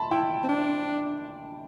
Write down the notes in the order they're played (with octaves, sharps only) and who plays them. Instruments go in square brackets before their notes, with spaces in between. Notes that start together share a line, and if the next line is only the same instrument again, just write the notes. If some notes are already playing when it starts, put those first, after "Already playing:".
Already playing: [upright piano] A5 B5 C6
[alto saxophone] E4 [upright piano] G5
[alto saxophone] C4
D4